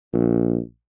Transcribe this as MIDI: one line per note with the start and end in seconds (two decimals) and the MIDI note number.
0.13 0.59 34